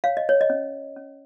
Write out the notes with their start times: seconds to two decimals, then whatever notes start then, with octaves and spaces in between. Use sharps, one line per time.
0.04 C#5 F5
0.17 D#5
0.29 C#5
0.41 D#5
0.50 C#4
0.96 C#4